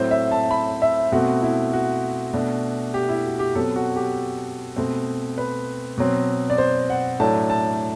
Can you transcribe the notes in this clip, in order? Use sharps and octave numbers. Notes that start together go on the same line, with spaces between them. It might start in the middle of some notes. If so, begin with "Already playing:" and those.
Already playing: A2 F#3 C4 C5
E5
A5
B5
E5
B2 A3 C4 F#4
E4
F#4
B2 A3 D4
G4
E4
F#4
G4
B2 F#3 C4 A4
F#4
G4
B2 A3 C4
B4
B2 F#3 C4
D5
C5
F#5
A2 F#3 A3 D4 A5
A5